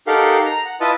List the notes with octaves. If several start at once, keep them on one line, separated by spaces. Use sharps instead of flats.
D#4 G4 A4 A#4 F5 F#5
A#5
F#5
E4 F4 B4 D#5 A5